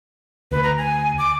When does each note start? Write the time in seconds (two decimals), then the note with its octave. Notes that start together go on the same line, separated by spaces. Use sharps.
0.52 D2 B4
0.63 A#5
0.78 G#5
1.18 D6